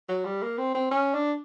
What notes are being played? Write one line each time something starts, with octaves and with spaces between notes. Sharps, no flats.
F#3
G3
A#3
C4
C4
C#4
D4